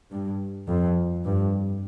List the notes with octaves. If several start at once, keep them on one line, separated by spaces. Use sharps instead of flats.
G2
F2
G2